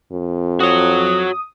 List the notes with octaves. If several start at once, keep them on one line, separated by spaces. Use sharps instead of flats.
F2
F#4 C#5 D#6